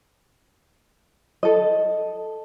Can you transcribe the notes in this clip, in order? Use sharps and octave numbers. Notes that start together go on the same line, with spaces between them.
A4 D#5